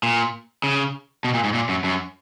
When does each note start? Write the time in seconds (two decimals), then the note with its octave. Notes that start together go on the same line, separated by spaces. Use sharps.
0.03 A#2
0.64 C#3
1.24 B2
1.34 A#2
1.44 G#2
1.54 A#2
1.69 F#2
1.84 F#2